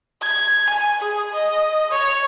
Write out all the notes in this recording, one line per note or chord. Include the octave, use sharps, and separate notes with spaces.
G#6
G#5
G#4
D#5
C#5